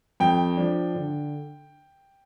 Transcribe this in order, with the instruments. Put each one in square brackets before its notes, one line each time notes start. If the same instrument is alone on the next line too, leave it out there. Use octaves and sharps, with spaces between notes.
[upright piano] F2 G5
F3 D4
D3